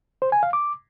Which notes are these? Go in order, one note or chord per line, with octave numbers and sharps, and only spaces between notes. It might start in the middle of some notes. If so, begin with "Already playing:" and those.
C5
G#5
F5
D6